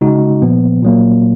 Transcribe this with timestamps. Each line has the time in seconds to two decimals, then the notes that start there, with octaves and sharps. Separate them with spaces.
0.01 C#3 G#3 D#4 F#4
0.42 A#2 F3 B3
0.82 A#2 F#3 A#3